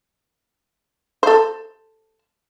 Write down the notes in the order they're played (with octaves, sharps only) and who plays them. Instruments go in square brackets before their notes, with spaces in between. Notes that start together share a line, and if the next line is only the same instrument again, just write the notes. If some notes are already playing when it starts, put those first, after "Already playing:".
[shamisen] A4 C5